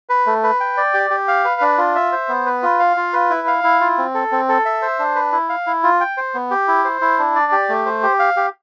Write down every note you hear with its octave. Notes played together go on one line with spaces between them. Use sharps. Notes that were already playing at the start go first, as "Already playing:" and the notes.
B4
A3
B4
G5
D5
G4
G4
F5
B4
D4
F4
E5
C5
B3
B4
F4
F5
F4
B4
E4
F5
E4
F4
C4
A4
C4
A4
E5
C5
D4
B4
E4
F5
E4
F4
G5
C5
B3
G4
E4
C5
E4
D4
D5
G4
A3
C5
G4
F5
G4